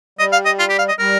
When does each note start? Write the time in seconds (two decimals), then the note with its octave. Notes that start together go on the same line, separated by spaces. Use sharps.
0.19 G3 D#5
0.33 F5
0.46 D#5
0.59 F4
0.70 G4
0.79 F5
0.89 D#5
0.99 G3 A#4